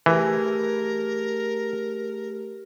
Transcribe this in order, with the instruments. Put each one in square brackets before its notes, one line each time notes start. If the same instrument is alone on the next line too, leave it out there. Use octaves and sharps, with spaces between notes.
[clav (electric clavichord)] E3 [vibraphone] A3 G4 G#4 [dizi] A#4